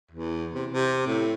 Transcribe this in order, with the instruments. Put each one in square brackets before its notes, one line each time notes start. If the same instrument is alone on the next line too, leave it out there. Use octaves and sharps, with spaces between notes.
[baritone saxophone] E2
C3
C3
A2